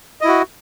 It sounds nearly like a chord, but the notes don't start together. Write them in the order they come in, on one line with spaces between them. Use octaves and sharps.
D#5 E4 F#4